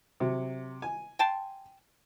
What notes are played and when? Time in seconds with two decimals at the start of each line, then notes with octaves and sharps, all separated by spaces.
0.20 C3 F#3
0.82 G#5
1.19 G5 A5 C6